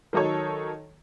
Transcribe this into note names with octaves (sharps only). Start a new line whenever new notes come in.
D#3 F#3 D#4 A4 C#5